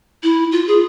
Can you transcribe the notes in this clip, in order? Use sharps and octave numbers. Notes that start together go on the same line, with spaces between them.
E4
F4
G#4